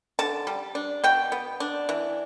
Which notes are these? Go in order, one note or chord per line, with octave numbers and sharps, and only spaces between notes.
D3 A5
G3
D4
B2 G5
B3
D4
E3